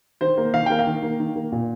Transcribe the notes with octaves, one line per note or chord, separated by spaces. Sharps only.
D#3 C5
A#3
D#3 F5
A#3 G5
F5
D#3
A#3
D#3
A#3
A#2